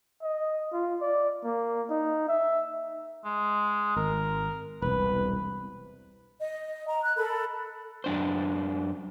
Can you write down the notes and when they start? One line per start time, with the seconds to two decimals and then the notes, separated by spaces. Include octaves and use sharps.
0.22 D#5
0.73 F4
1.01 D5
1.44 A#3
1.90 D#4
2.28 E5
3.25 G#3
3.96 G#1 A#4
4.82 E1 C2 B4
6.40 D#5
6.87 A#5
7.03 F#6
7.17 A4 A#4 B5
8.04 F#2 D4 C5